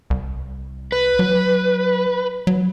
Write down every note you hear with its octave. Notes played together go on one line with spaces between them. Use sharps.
C2
B4
F#3
F#3